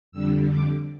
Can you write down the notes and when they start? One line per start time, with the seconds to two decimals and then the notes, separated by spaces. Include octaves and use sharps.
0.12 F2 D3 G3 E6
0.50 D6